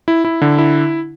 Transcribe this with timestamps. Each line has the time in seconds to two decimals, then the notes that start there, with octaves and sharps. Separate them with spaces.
0.08 E4
0.25 E4
0.42 D3
0.58 E4